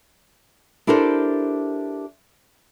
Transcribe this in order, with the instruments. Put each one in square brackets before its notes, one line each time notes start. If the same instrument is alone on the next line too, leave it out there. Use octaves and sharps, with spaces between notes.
[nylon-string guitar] D4 E4 G4 A4 A#4 C5